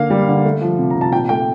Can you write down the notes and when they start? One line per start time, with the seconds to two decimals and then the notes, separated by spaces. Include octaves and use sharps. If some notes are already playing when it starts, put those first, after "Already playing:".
Already playing: D3 A#3 F5
0.10 G3
0.28 D3
0.45 A3
0.61 F3
0.79 C3
0.90 A#5
0.96 C3
1.01 A5
1.12 A#2 G5
1.29 A3 G5